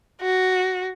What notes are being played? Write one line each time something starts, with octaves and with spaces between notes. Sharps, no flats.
F#4